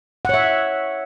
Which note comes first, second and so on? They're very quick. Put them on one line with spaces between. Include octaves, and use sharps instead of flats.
F#5 C#5 E5